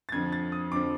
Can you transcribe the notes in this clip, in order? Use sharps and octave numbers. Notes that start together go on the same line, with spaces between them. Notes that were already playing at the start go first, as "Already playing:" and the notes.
A6
F2 D3 F3 G#6
A6
D#6
F2 D3 F3 D6